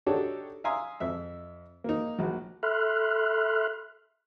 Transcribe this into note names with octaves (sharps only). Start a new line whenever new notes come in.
D4 D#4 F#4 G4 A4 C#5
E5 F5 G#5 A#5 C6 D#6
F2 E5
A#3 D#4
A#1 F#3
A4 E5 B5 C6 F6 F#6